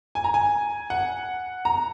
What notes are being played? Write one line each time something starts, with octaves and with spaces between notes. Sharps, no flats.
G#5
A#5
G#5
F#5
A#5